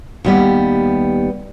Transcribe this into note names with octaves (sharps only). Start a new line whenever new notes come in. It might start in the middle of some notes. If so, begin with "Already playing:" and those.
D#2 G3 B3